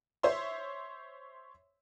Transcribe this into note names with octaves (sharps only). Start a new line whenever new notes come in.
C5 C#5 E5 C6